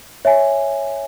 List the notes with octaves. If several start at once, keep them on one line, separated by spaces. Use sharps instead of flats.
C#5 E5 G#5